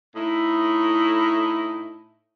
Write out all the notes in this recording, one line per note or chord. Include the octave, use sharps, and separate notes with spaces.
A2 D#4 E4